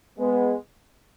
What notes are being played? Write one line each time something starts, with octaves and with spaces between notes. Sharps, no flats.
G#3 B3